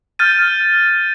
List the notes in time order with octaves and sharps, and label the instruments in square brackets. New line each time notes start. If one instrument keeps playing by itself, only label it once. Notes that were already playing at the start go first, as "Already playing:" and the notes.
[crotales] F6 G6 A6 D#7